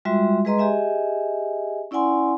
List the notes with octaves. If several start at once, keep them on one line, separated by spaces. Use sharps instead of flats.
G3 G#3 F4 F#4 E5 C6
G#3 G#4 B4 D#5 A#5 C6
G4 G#4 D#5 E5 G#5
C#4 E4 D5 F#5 G#5 C6